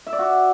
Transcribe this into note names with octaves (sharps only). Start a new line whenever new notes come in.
E5
D5
F#4